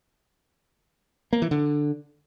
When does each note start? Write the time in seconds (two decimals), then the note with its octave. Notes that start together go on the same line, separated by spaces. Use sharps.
1.33 A#3
1.42 E3
1.51 D3